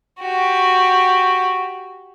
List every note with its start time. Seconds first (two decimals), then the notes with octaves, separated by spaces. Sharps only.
0.20 F#4 G4